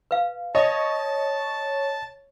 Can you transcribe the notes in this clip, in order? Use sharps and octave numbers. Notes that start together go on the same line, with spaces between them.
B4 F5
C#5 D#5 A5